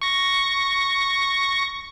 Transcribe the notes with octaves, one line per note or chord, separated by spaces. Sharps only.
C#6 A#6